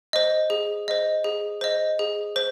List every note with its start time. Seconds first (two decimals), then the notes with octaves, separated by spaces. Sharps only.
0.13 C5 D#5
0.50 G#4
0.88 C5 D#5
1.24 G#4
1.61 C5 D#5
1.99 G#4
2.36 C5